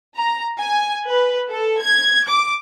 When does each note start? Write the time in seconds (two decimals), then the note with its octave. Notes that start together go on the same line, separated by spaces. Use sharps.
0.16 A#5
0.60 G#5
1.08 B4
1.49 A4
1.80 G#6
2.26 D6